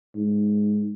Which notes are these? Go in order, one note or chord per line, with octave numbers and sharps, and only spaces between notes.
G#2